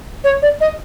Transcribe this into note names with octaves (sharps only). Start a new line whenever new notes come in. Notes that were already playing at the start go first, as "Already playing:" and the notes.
C#5
D5
D#5